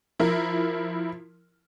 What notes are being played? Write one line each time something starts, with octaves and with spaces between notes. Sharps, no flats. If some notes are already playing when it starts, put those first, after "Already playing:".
F3 E4 A#4